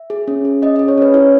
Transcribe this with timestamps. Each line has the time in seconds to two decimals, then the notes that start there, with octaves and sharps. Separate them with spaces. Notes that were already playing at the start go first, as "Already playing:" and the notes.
Already playing: E5
0.10 G#4
0.28 C#4
0.45 G#4
0.62 C#4 D#5
0.76 G#4 D#5
0.88 C#5
0.98 C#4 B4
1.14 E4 C#5